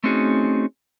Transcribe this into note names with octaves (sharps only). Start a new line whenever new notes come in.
A3 C4 C#4 D#4 F#4 G#4